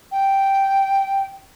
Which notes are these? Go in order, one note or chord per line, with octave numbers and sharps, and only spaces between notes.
G5